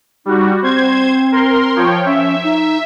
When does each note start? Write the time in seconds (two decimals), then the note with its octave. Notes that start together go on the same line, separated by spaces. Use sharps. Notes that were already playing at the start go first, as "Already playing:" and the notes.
0.26 G3 D#4 F#4
0.62 C4 C5 G#6
1.32 A#4 C6
1.76 F3 C#5 G5
2.06 C#4 E5
2.43 D#4